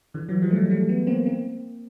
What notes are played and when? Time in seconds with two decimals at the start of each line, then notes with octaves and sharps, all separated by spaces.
0.14 D3 E3
0.29 E3 F#3
0.42 F3 G3
0.51 A3
0.56 F#3 G#3
0.70 G3 A3
0.89 A3 B3
1.07 A#3 C4
1.26 A#3 C4